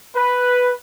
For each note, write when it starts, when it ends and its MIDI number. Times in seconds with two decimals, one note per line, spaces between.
0.16 0.71 71